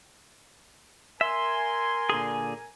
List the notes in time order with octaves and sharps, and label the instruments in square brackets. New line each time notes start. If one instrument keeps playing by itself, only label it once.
[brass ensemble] A#4 G#5 [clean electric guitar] E5 [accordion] C6
[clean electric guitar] A#2 D3 G#4